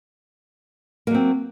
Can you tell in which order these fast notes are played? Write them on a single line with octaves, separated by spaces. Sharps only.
A#3 F#3 C4